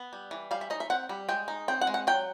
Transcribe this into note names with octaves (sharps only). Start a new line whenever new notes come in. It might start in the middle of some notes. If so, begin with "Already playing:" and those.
Already playing: B3
G3
E3
G3 F5
E5
D#4 D#5
E5
C4 F#5
G3
G#3 G5
D#4
C4 G5
F#5
G#3
F#5
F#3 G5